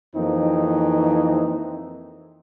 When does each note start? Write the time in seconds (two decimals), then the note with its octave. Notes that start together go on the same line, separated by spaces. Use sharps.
0.15 F2 E3 A#3 C4 D#4